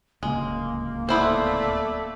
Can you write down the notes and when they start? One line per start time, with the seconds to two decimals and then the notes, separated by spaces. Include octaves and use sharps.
0.23 D1 C#2 G#3 A#3
1.09 A3 B3 E4 C5 D5